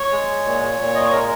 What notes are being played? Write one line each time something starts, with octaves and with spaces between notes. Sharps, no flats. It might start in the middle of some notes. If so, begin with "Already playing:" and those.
Already playing: C#5
G#3
A#2
A#2
D#5
C#5
G#3 A#4